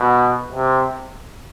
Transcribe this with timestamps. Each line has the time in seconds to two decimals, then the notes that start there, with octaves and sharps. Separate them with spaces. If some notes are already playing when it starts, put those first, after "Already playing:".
Already playing: B2
0.53 C3